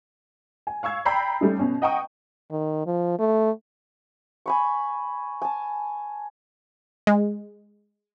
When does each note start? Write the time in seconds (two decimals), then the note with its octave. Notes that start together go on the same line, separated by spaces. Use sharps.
0.67 G#5
0.83 F5 C#6 E6 G#6
1.05 G5 A#5 B5 E6 G6 C7
1.41 G3 A3 C#4 D#4
1.59 B2 C#4
1.82 D#5 F#5 G5 A#5 C#6 D#6
2.51 D#3
2.86 F3
3.19 A3
4.46 G#5 B5 C#6
5.42 G#5 A5
7.07 G#3